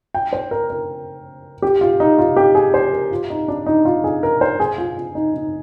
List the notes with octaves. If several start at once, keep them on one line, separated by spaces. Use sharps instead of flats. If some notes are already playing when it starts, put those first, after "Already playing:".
G5
C5
A#4
A#4
G4
F4
D#4
F4
G4
G#4
C5
A#4
F4
D#4
D4
D#4
F4
G#4
A#4
C5
G#4
F4
F4
D#4
D#4